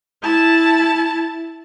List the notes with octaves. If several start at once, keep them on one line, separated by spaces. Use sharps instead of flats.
E4 A5